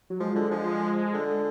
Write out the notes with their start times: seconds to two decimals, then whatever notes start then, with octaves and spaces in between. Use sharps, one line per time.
0.10 F#3
0.20 F3 G#3
0.36 D3
0.51 F3
1.13 D3